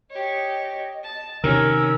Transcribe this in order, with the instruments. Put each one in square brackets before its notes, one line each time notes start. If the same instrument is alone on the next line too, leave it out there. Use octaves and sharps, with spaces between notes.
[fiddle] G4 C#5 [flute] D#5
[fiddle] A5
[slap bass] C3 D#3 [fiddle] C#4 [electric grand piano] A#4 [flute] E6